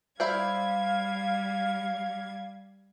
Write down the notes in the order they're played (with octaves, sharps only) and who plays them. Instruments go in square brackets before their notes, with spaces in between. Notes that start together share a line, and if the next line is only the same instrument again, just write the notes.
[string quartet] G3 G#6 [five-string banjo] E4 C5 D5 [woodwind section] F5